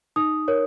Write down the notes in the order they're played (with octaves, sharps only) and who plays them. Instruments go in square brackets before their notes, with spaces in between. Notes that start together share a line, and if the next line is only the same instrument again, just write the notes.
[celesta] D#4 D#6
A#4 C#5